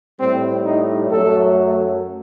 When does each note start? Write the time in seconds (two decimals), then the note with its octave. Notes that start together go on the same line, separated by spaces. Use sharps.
0.19 A2 G3 C4
0.66 D#4
1.11 F#2 F#3 A3 A4